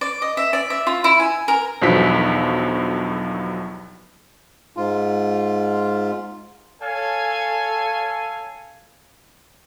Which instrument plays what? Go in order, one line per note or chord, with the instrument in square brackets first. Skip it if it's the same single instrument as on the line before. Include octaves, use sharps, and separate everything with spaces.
[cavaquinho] D5
D#5
E5
D5
E5
F4
E4
G#5
A#4
[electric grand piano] B1 E2 G2 F3 F#3 B6
[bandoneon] G#2 F4
[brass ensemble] A4 C#5 F5 G#5